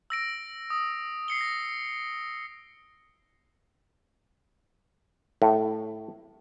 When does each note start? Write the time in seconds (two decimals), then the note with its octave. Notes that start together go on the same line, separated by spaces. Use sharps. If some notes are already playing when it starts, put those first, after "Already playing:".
0.10 E6 A#6 D7
0.70 D#6
1.28 C7 C#7 G7
1.41 A#6
5.42 A2